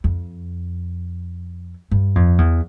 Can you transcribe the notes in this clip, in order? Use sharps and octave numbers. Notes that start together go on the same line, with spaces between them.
F2
G2
F2
E2